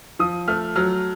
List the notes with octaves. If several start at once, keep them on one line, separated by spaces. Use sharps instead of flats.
F3 D#6
A3 F6
F#3 F6